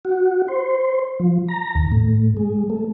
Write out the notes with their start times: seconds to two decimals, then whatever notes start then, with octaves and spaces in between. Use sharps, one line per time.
0.05 F#4
0.48 C5
1.20 F3
1.48 A#5
1.75 D#2
1.92 A2
2.37 G#3
2.70 A3